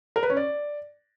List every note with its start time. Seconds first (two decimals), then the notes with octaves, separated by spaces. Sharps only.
0.16 A#4
0.23 B4
0.30 C#4
0.37 D5